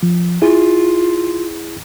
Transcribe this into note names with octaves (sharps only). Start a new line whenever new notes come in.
F3
E4 F4 G#4